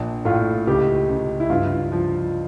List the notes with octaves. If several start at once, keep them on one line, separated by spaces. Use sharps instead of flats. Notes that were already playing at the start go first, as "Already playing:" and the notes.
Already playing: A#1 D4
A2 F4
C#2 G4
C#2
E4
G2 F4
F3